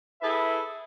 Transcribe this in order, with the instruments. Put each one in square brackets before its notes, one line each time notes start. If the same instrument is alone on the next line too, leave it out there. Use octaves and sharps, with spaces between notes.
[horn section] E4 G#4 A4 B4 E5